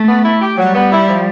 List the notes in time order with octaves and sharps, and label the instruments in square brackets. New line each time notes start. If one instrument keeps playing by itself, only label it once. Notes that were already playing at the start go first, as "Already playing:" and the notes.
Already playing: [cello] A3
[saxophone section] B3
E4
G4
[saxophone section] F#3 [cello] G3
[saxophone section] B3
E4
F3